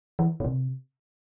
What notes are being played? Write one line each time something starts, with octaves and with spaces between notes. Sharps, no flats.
E3
B2
C3